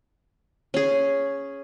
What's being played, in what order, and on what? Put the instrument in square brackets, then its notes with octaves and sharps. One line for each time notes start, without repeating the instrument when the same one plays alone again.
[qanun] C#4 G#4